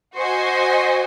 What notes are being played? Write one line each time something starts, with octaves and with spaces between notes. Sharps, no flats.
F#4 C5 D#5 G#5